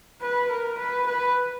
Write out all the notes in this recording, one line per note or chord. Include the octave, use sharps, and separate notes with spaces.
B4
A#4
B4
B4